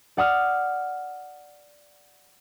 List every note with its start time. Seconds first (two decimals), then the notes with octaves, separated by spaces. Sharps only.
0.17 D5 F#5 D#6 F6